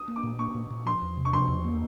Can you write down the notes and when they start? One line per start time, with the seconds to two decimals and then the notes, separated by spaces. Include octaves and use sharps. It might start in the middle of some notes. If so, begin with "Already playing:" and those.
Already playing: D#6
0.08 A#3
0.16 D6
0.24 A#2
0.39 A#3 C#6
0.55 A#2
0.71 A#2
0.86 F3 C6
1.02 E2
1.17 C3
1.25 C#6
1.33 F3 C6
1.48 E2
1.65 A#3